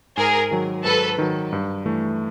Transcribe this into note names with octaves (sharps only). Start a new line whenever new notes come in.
G#2 G#4 A#4
D#3 F#3
G#2 A4 B4
D#3 F#3
G2
E3 A3